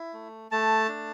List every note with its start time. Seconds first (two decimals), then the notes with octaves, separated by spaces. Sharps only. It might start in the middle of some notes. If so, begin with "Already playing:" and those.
Already playing: E4
0.13 A3
0.51 A3 A5
0.89 D4